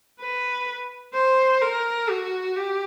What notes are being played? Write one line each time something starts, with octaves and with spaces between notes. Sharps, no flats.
B4
C5
A#4
F#4
G4